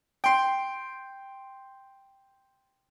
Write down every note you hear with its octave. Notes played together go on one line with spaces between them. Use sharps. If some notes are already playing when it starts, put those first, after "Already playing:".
G5 C6